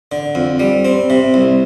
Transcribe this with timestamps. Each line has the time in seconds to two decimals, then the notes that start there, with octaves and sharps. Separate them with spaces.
0.12 D3
0.35 F2
0.60 G3
0.85 C4
1.10 C3
1.34 C2